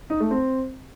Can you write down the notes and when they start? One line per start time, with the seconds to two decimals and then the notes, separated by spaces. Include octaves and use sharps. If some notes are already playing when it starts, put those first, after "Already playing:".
0.10 D#4
0.20 A3
0.31 C4